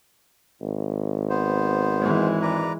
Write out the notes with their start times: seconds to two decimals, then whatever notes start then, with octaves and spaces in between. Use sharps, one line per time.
0.61 G#1
1.30 B3 C5
2.00 E3 G#3
2.42 B4 D5 A#5